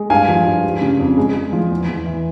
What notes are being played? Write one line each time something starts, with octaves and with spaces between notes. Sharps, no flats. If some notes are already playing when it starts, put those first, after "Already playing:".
Already playing: G#3
G2 F5 G#5
F3
G2
G3
C#3
F2
G#3
G#3
F3
E2
E2
E3